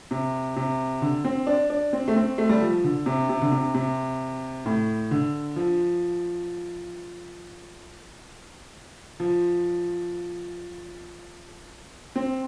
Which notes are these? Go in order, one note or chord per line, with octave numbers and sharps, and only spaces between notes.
C3
C3
D3
C4
D4
D4
C4
A3
C4
A3
G3
F3
D3
C3
C3
D3
C3
C3
A2
D3
F3
F3
C4